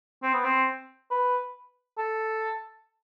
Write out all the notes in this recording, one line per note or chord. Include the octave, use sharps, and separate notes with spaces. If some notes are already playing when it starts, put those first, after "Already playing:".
C4
B3
C4
B4
A4